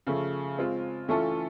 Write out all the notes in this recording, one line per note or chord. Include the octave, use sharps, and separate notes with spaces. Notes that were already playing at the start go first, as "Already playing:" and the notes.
C#3 F3 A3
G#3 C4 F4
E3 A3 C#4 F4 A4